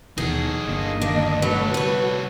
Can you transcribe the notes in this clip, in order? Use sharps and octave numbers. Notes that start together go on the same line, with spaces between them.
D#2 B2 E3 D#4 G#4 A4
G1 D3 A#3 D#5
D#2 D4
C2 F#3 A3 A4 B4
G3 F#4 B4 C#5